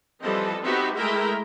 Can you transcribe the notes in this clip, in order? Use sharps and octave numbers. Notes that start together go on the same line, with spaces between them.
E3 F3 G3 C4 A4 D#5
B3 C4 D#4 F#4 G4 E5
G#3 A3 E4 A#4 E5 G5